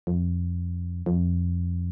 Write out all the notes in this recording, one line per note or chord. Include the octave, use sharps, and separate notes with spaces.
F2
F2